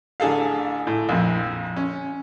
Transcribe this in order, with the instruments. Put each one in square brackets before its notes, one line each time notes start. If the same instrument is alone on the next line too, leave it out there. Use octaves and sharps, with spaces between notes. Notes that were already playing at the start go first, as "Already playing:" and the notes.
[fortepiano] A1 D3 G#4 A4 F5
A2
A#1 F2
C#4